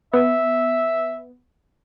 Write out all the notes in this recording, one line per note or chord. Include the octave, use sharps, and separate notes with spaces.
B3 E5